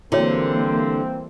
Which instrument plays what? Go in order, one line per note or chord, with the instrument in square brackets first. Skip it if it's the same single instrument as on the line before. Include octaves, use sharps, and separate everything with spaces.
[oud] D3 [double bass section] E3 G3 A#3 [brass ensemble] C4 [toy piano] E4 F#4 C#5